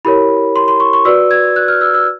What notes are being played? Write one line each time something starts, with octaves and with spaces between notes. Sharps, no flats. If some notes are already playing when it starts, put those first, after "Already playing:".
E4 G4 A#4 C#5 B5
C6
C6
C#6
C#6
F#4 B4 D5 E6
G#6
F#6
F6
E6
E6